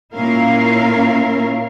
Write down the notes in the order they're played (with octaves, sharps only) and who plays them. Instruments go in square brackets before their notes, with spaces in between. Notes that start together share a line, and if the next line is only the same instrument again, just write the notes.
[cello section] A#2 C#4 E4 A#4 F5